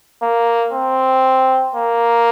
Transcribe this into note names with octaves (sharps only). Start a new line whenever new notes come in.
A#3
C4
A#3